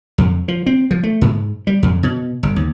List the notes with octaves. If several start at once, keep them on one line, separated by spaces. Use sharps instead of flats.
F2
F3
C4
F3
A3
G#2
G3
F2
B2
G1
D#2